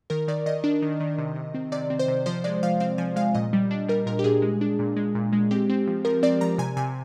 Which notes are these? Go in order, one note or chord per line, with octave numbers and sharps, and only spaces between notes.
D#3 A#4
D#3 D5
D#3 D#5
D4
D#3
D#3
C3
C3
C4
C3 D5
C4
C5
C3
F3 C5
G#3 D5
F3 F5
C4 F5
F3 G#5
G#3 F5
A#2 D#5
G3
D4
G3 A#4
A#2 A#4
G4
A#2 G#4
G#3
D4
A#2
G#3
A#2
G#3
C4 G4
C4
F3
F3 A#4
C4 D5
F3 A#5
C3 G#5
C3 G#5